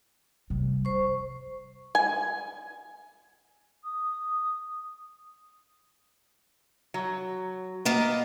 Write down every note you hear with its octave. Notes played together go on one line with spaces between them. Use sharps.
C3 G3
F#2 F3 C5 C#6
G#5
D#6
F#3
A#3 B3 A#4 D#5